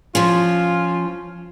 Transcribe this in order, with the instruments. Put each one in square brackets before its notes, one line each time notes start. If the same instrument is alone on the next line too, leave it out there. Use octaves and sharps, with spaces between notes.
[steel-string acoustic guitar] F3 C#4 [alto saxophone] F4